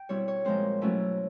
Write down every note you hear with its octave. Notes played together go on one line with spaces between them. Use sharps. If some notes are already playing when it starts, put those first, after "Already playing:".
Already playing: G5
B2 G3 C4 E4 C#5
C#5
A#2 F3 G#3 C4 C5
B2 F#3 A3 C#4 E4